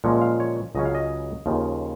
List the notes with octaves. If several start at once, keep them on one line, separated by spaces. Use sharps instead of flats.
A#2 F3 G#3 C#4 F#5
F5
C#5
C#2 C#3 F#3 C#4 D#5
F5
D#5
D#2 C#3 F3